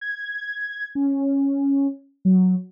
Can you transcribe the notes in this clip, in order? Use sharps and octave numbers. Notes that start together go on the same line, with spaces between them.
G#6
G#6
C#4
F#3